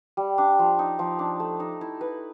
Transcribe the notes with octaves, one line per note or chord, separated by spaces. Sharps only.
G3
D4
F3
D#4
F3
D4
A3
D#4
E4
B4